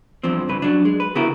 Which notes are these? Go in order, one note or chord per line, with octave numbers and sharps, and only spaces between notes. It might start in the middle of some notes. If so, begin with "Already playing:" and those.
E2 G2 F3 C4
G2 C#3 B4
F#3 D4
G#3
B4
C#3 B3 E4 F#4 G4 A#4